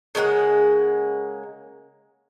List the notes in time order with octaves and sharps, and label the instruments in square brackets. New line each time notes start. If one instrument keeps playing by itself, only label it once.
[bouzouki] C#3 G#3 A#3 F#5